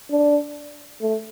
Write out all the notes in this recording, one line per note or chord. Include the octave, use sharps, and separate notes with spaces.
D4
A3